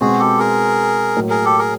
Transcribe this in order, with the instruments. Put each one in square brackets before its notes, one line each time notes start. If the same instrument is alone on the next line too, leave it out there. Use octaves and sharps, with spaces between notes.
[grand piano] B2 G#3 C4 [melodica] F#4 G#4
[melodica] G4 A4
G#4 A#4
[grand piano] A2 F#3 A#3
[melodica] G#4 A#4
G4 A4
G#4 A#4